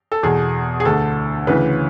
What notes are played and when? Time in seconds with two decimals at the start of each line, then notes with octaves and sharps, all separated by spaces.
0.12 A4
0.23 E2 B2 G#4
0.80 G#4
0.85 D2 D3 A4
1.47 D2 C#3 E3 B4